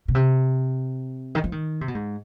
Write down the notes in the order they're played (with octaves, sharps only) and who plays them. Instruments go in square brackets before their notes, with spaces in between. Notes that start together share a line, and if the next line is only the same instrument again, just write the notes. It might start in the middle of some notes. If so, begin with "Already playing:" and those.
[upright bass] B2
C3
D#3
F3
D#3
C3
B2
G#2